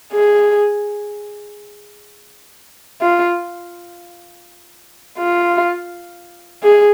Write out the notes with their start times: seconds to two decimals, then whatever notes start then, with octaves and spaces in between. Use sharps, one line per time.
0.13 G#4
3.01 F4
5.19 F4
6.63 G#4